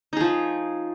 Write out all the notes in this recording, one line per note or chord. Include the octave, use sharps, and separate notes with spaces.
F3 D#4 G#4